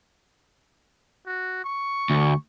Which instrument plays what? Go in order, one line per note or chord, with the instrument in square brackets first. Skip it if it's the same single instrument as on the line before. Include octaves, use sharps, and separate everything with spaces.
[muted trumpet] F#4
C#6
[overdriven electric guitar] D2